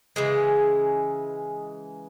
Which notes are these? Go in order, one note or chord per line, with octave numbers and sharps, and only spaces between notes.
C#3 E3 G#3